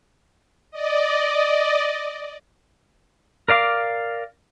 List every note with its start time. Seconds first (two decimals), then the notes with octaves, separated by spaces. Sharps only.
0.71 D5 D#5
3.48 A#4 D5 F5 D6